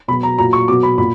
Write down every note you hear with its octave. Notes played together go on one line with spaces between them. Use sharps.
B2 F#3 B5
A#5
A#2 F#3 A#5
C#6
B2 F#3 D6
B5
A#2 B5